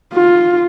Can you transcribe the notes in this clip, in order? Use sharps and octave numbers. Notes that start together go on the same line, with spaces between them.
F4